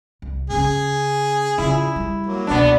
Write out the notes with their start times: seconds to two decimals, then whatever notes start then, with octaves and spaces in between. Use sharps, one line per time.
0.22 C2
0.50 C#3 C#4 G#4
1.58 C#3 E4 F4
1.96 G3
2.26 F#3 A#3
2.47 C#2 B2 B3 D4